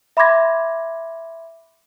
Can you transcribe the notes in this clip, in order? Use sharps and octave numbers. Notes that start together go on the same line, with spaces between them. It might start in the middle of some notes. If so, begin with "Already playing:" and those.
E5 B5 C6 D6 G#6 A#6